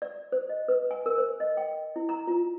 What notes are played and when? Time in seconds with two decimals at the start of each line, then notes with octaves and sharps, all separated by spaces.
0.02 D5
0.32 C5
0.49 D#5
0.68 B4
0.91 G#5
1.06 A#4
1.18 C5
1.40 D#5
1.57 G5
1.96 E4
2.09 A#5
2.27 F4